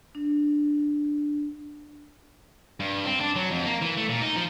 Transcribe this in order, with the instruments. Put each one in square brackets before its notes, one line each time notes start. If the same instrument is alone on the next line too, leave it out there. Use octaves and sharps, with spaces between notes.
[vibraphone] D4
[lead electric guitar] G2
C4
D4
F#3
F2
A#3
E3
A3
A#2
D#4
F3